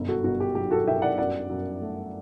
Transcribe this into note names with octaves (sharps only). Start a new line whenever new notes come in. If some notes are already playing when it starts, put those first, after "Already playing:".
Already playing: G1 F#2 D3
F#4 A4
G1 F#4
G4
F#3 G4
F#4 A4
G2 E5 G5
D5 F#5
F#2 D5 F#5
F#2
A3